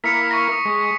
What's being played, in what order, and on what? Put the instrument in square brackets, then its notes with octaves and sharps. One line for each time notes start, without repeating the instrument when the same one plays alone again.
[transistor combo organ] A#3 E4 A#4 [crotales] B6 C#7
[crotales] C#6 A#6
D#6
[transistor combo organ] G#3